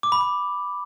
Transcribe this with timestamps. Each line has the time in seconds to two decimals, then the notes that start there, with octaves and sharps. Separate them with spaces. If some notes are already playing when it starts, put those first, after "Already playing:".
0.03 D6
0.12 B5
0.21 D6